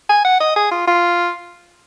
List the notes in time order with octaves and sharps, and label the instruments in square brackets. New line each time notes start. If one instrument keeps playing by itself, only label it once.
[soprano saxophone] G#5
F#5
D#5
G#4
F4
F4